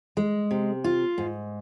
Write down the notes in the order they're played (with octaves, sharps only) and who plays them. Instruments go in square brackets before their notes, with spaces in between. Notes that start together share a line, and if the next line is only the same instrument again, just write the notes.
[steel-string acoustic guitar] G#3
C3
F4
G#2